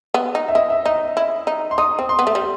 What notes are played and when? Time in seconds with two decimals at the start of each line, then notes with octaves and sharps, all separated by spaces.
0.14 B3
0.35 D#4
0.48 E5
0.55 E4 D#5
0.70 E5
0.86 D#4 D#5
1.17 E4
1.47 D#4
1.71 C6
1.78 D#4 D#6
1.99 C4
2.09 C6
2.19 B3
2.27 A3
2.35 G3